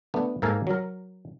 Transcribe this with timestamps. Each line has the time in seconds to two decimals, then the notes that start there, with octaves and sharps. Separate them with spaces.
0.14 A3 B3 D4
0.42 G#2 A#3 A4 A#4 F5 G#5
0.67 F#3 A#4